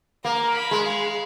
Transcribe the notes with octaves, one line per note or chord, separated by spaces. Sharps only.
A#3 A#5
B5
G#3
F5